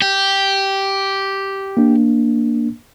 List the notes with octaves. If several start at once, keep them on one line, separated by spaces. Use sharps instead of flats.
G4
A#3 D4